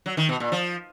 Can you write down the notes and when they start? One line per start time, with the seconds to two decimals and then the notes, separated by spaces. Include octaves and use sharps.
0.06 F#3
0.17 D#3
0.29 B2
0.40 A#2
0.52 F3